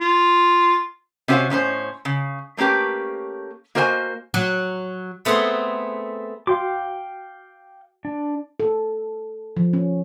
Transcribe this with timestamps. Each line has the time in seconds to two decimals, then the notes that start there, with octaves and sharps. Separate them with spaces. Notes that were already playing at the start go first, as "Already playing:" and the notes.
0.01 F4
1.28 C3 C#4 F#4 C5 C#5 F5
1.50 A2 C#4 D#4 C5
2.05 C#3
2.57 A3 A#3 C#4 G4 B4
3.75 A#3 F#4 A#4 C5 E5 G#5
4.34 F#3
5.25 A3 B3 C4 G#4 F#5 C6
6.47 F#4 F5 G5 D6
8.05 D4
8.60 A4
9.57 F3
9.73 C#4